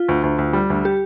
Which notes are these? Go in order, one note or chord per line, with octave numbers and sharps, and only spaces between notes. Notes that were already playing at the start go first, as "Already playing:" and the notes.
Already playing: F4
D2
D2
D2
G3
D2
G4